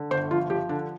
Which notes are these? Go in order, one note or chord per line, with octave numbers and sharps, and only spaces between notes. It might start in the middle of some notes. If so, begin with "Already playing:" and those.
Already playing: D3
G1 C5
F3 F4
F3 G4
D3 D4